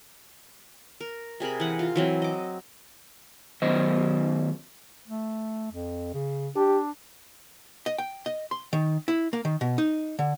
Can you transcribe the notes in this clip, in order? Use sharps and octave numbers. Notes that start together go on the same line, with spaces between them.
A#4
C3 G#4 A#4 B5
E3 F#5
F4
E3 F#3 C4
D#5 D6
F#2 D#3 F#3 B3 C5 D#5
A3
F2
C#3
D4 G4
D#5
G5
D#5
C6
D#3
E4
A#3
D#3
B2
D#4
D3